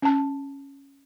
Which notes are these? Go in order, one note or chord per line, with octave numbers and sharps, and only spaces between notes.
C#4 A5